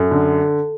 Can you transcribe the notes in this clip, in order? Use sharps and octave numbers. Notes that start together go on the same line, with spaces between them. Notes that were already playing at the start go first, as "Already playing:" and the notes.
Already playing: F#2 A4
D3